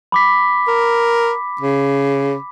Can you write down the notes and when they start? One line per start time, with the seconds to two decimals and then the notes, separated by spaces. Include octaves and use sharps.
0.12 B5 D6 B6
0.68 A#4
1.61 C#3